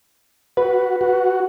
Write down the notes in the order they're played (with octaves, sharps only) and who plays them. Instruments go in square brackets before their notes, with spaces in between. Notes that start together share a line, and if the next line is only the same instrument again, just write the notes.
[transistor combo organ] F#4 [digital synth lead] B4
[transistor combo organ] F#4